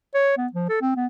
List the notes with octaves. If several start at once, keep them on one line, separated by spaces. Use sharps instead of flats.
C#5
B3
F3
A4
C4
B3